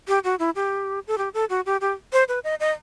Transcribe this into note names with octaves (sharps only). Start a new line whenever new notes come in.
G4
F#4
E4
G4
A4
G4
A4
F#4
G4
G4
C5
B4
D#5
D#5